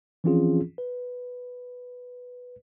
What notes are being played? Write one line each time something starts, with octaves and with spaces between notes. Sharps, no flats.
E3 F3 C4 C#4 F4 G#4
B4